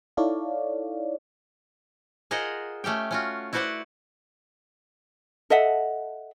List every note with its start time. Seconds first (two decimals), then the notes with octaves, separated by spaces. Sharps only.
0.17 D#4 E4 A4 C#5 D5 F5
2.31 F4 G#4 A#4 C5 D#5 F#5
2.84 A3 C#4 G4 G5
3.11 C#4 F4 F#4
3.53 E4 F#4 B4 C5 D5 F#5
5.50 A4 D#5 E5 F#5